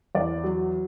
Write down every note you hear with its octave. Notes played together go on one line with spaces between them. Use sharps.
E2 D5
F#3